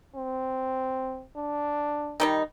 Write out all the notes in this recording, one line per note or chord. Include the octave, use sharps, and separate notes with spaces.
C4
D4
D#3 G3 D#4